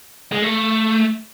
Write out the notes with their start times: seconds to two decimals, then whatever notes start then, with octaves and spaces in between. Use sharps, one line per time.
0.32 G#3
0.42 A3